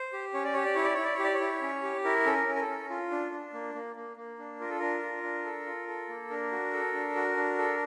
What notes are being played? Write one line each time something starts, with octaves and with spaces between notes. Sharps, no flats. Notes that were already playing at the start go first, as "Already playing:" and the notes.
Already playing: C5
G4
C#4 C#5
D5
G4 C#5
D5
E4 C#5
D5
E4 C#5
D5
C#5
G4
D5
C#5
E4
C#4
G4
E4 A#4
C#4 A4
A#4
C#4
A#4
A4
C#4
F4
D4
D4
A#3
A#3
A#3
A#3
D4
F4 A#4
A4
D4 A#4
F4
D4
A4
F4
A4
A#3
D4 A#4
F#4
A4
D4
F#4
D4
A4